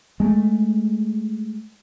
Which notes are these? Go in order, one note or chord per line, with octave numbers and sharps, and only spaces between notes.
G#3 A3